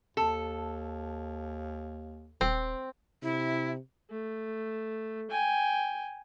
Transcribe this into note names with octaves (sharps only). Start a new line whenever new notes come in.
D#2 A4
D#1 C4
C3 E4
A3
G5 G#5